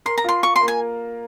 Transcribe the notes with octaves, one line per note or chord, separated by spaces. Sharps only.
A#4 C6
A#5
F4 C6
F4 C#6
C6
A#3
G#5